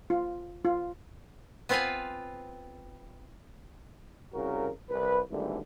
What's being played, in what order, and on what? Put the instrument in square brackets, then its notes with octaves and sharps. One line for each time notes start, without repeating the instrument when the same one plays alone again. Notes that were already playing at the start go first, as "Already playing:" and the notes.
[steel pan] F4
F4
[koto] B3 C4 F4 B4 F5 G#5
[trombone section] C2 C#3 F#4 A#4
C2 B4
G#1 D3 E3 G3 A3